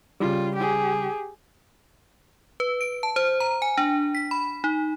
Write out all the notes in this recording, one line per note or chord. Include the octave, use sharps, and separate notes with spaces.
C#3 G3 F4
G4 G#4
B4
D7
A5
C5
A#5
G#5
D4
B6
B5
D#4